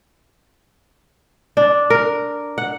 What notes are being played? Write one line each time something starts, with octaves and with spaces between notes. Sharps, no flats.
D4
A#4
F#5